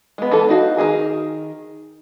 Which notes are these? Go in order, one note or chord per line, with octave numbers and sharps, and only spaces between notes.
G#3 B3
E3 A4
D#4 F#4 F5
D#3 F#3 G#4 A#4